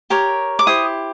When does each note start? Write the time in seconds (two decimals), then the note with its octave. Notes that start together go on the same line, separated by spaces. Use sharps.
0.10 G4 A#4 C#5
0.59 D6
0.67 E4 G4 C5 D#6